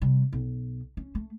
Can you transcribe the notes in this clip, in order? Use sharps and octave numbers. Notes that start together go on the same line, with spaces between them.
C3 G3
B1
C#4
A3